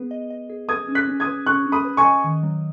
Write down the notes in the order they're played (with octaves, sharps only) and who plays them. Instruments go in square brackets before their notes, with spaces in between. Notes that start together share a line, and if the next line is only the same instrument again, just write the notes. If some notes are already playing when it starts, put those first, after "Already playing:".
Already playing: [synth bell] B3 G#4 B4
D#5
D#5
G#4
[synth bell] B4 [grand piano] D#6 G#6
[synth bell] C#4
[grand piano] F#6 B6
[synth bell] C#4
[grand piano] D#6 G#6
[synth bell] B4
[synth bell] C#4 [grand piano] C#6 F#6
[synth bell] C#4
[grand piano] B5 D#6
[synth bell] B4
[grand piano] G#5 C#6
[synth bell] D#5
D#3
F#3